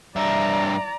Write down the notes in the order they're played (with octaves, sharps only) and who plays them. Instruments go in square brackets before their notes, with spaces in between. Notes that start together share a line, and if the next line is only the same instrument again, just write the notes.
[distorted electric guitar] G2 E5 [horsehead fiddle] D5 A#5